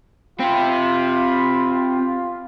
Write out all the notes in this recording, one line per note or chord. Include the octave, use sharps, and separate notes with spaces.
C4 F4 G4 B5